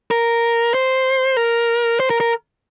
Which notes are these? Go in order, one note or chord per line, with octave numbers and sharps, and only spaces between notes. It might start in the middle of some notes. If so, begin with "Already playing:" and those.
A#4
C5
A#4
C5
A#4
A#4